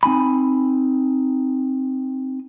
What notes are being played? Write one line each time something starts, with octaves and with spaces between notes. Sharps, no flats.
C4 D#4 G#5 B5